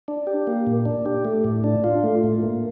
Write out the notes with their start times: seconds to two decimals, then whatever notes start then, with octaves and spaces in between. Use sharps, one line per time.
0.08 D4
0.27 G4
0.47 A#3
0.67 A#2
0.85 D4
1.06 G4
1.25 A3
1.44 A2
1.64 D4
1.84 F4
2.03 A3
2.24 A2
2.43 A#3